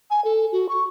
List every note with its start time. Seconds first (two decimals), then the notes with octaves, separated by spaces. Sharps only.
0.10 G#5
0.25 A4
0.52 F#4
0.69 C#6